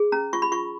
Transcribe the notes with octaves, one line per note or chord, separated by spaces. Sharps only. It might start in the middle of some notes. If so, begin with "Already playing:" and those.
Already playing: G#4
C#4 A#5
F4 C#6
B5
F4 C#6